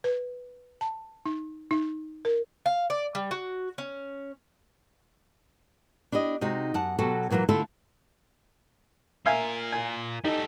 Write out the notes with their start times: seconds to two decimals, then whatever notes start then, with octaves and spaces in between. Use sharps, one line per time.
0.04 B4
0.81 A5
1.26 D#4
1.71 D#4
2.25 A#4
2.66 F5
2.90 D5
3.15 G3
3.31 F#4
3.78 C#4
6.12 D4 E4 G4 D#5
6.41 C3 G#3 D#4 F#4
6.74 F#2 F#5 A5
6.99 B2 F#3 F#4 G4 A4
7.30 A#2 E3 F#3 G#3 A#3
7.49 D3 A3 E4 F4 A4
9.26 F4 A#4 E5 F5 G#5
9.72 G#5
10.24 G3 D#4 A4